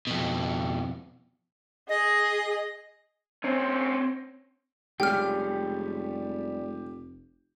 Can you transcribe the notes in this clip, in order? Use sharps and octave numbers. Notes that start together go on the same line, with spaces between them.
F2 B2
G#4 D#5
C4 C#4
F1 G3 G#3 C#4 G4 G5 F6